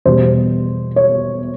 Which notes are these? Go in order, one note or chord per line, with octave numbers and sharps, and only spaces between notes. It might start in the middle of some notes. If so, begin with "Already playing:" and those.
E2 B2 G3 C5
C#5